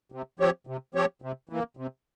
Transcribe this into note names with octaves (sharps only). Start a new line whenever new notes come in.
C3
F3 C4 G4 C#5
C3
F3 C4 G4 C#5
C3
E3 A#3
C3